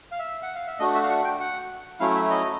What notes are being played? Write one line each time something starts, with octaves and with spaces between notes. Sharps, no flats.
F5
E5
F#5
F5
E5
A3 D4 F#4 D#5
E5
F5
F#5
G5
F#5
F#3 A3 C#4 E4 F5
E5
D#5